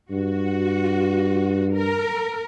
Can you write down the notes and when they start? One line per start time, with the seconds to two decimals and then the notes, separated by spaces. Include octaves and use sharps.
0.11 G2 F#4
1.75 A#4